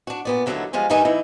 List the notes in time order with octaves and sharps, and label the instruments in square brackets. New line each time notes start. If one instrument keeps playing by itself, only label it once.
[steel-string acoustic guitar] D4 F#4
A#2 B3 D5
D#2 D3 F#3 A3 D#4 E4
E2 F3 G3 G#3 F5
G2 D#3 E3 G3 D#4 G#5
E3 D#4 E4